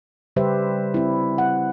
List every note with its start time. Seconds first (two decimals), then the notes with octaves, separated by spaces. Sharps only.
0.36 C#3 G3 G4 B4 C5 E5
0.94 C4 E4
1.38 F#5